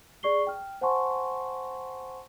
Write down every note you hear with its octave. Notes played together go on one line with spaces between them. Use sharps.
G#4 D5 C#6 C7 G7
G5 F6
C5 F#5 G#5 A5 C6 C#6